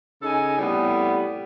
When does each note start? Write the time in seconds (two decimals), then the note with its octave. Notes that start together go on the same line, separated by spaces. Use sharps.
0.22 C#3 D#4 A4 D#5 G#5
0.59 A2 C3 G3 B3